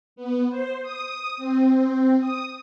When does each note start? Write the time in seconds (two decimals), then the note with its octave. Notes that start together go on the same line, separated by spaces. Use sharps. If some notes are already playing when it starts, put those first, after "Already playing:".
0.16 B3
0.50 C5
0.82 D#6
1.37 C4
2.19 D#6